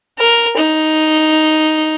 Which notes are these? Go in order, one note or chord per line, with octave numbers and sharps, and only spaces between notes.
A#4
D#4